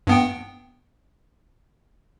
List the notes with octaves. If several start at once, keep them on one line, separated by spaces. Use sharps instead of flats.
G2 B3 G5